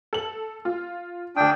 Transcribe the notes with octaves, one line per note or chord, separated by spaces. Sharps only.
A4 F#7
F4
D2 D4 G5 D#6